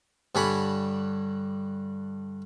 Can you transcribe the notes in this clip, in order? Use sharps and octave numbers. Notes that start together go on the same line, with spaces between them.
G2 D3 G3 C#5 G#5 B5